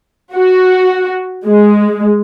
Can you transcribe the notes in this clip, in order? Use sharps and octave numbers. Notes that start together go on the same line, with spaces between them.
F#4
G#3